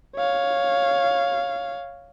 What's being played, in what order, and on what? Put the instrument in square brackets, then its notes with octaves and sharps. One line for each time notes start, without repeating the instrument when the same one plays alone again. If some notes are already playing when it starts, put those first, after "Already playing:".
[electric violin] C#5 F5